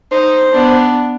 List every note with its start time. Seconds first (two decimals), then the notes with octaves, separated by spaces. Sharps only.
0.11 D#4 C5
0.53 B3 D4